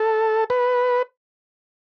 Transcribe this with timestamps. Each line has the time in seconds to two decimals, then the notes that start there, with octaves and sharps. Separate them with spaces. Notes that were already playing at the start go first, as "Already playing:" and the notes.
Already playing: A4
0.50 B4